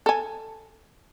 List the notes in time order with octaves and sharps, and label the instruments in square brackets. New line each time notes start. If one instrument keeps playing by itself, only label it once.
[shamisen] A4 G#5